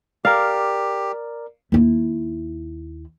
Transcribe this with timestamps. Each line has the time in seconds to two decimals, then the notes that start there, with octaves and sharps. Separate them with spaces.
0.25 G4 A#4 D5 F5
1.72 D#2 E4